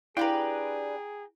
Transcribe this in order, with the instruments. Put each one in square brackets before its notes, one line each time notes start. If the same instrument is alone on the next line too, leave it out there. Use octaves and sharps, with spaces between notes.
[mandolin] D4 G4 B4 [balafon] E4 F5 [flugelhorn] G#4 [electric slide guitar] G5 A#5